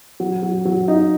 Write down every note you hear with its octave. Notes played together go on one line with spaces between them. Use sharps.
F#3
F#3
F#3
D#4